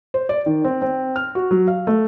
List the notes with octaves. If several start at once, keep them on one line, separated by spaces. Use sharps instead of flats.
C5
D5
D#3
C4
C4
F6
F#4
F#3
F5
A3